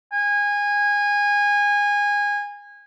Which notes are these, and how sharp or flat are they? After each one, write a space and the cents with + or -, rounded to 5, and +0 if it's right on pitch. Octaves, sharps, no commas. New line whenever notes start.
G#5 -20